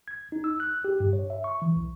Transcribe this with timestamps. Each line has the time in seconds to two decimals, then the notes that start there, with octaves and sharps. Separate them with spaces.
0.08 G#6
0.32 D#4
0.44 E6
0.60 F#6
0.84 G4
1.00 G2
1.13 C#5
1.30 E5
1.44 C#6
1.62 E3
1.76 B1